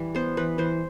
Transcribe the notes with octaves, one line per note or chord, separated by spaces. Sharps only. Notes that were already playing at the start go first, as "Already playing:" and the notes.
Already playing: E3 G3
B3 C5
E3 B4
E3 C5